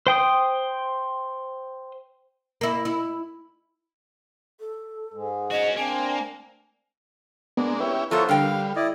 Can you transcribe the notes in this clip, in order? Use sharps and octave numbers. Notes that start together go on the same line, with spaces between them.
C5 G5 D#6
A#3 E4
E4
A4
G#2 G#3
C#4 F#4 D#5
A#3 C4 D4 G#5
G#3 A#3 B3 D4
C#4 E4 G4 B4
F3 B3 E4 F4 A4 A#4 C5 C#5
D3 G3 A#4 F5 G5
E4 D5 D#5